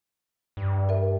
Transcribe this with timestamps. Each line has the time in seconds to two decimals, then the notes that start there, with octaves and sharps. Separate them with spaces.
0.57 G2
0.89 A#4 E5